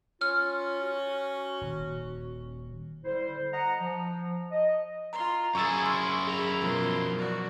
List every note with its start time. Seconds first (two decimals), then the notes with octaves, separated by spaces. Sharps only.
0.21 C#4 F4 F6
0.82 F#4
1.61 D#1
3.05 D3 G3 E4 C5
3.53 D#5 F#5 A#5
3.81 F3
4.52 D#5
5.13 F4 A#5 C6
5.55 F#2 E4 G#4 G#5 C#6 E6 A6
5.86 C6 F6
6.27 G#4 A#5 B5
6.62 B2 F3 F#3 A#4 C6
7.17 F#4 D5